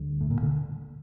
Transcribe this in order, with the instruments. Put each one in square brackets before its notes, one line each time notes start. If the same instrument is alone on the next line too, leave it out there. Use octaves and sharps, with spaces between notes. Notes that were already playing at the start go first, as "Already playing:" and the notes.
Already playing: [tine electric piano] D2 D3 G3
[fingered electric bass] A2
A#2
D3